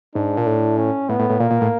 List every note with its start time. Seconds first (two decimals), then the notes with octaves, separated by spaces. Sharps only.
0.15 G#2 D4
0.37 A#2
0.46 A2
0.77 C#4
1.09 A2 B3
1.19 A2
1.30 A2
1.40 A#2 A#3
1.51 A#2
1.61 A2